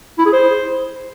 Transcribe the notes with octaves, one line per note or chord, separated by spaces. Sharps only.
E4
G#4
C5